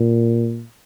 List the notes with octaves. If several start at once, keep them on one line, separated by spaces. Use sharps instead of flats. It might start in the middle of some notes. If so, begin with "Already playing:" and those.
Already playing: A#2